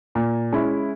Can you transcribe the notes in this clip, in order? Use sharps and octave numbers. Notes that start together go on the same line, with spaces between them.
A#2
G#3 C#4 E4